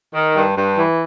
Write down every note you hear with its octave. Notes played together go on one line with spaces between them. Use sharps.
D#3
G2
G2
E3